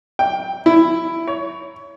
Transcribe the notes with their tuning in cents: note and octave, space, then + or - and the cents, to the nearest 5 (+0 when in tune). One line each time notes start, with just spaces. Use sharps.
G5 +10
E4 +10
C#5 +25